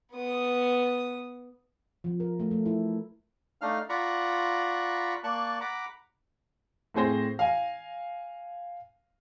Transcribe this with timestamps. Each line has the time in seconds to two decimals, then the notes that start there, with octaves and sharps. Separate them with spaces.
0.13 B3 D#6
2.04 F3
2.20 A#4
2.39 A3
2.51 A3
2.66 E4
3.61 A3 D4 D#4 F5 F6
3.89 F4 D5 F#5 A#5 B5 C#6
5.24 A#3 D5 A5 C#6 F#6
5.61 F#5 A#5 B5 D6
6.94 A2 C4 G#4 C5 A#6
7.39 F5 G#5